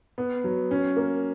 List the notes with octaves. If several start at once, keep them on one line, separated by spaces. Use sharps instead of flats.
B3
F#3
C#4
A#3